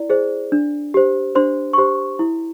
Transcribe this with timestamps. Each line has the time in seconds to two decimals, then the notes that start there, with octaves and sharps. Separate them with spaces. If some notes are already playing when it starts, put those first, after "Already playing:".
Already playing: E4 D5
0.10 G#4 C5
0.52 D4
0.94 G4 C5
1.35 D4 C5 C6
1.73 C#6
1.78 G4 C5 C6
2.19 E4